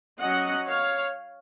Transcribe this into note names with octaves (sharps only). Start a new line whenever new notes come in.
F#3 C#4 D#5 F#5
C#5 F5